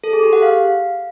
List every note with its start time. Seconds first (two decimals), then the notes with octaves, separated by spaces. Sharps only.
0.04 A4
0.13 G#4
0.23 G4
0.33 F#5
0.43 F5